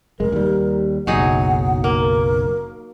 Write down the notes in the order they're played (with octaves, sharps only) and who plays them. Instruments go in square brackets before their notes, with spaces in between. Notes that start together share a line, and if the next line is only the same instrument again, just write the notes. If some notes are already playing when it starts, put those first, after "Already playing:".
[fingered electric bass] F1 G#3 [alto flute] A#4
[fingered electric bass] D#2 G3
[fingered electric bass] F#1 B1 [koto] F#3 D#4 G#4 [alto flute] F#5
[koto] A#3 [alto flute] A#4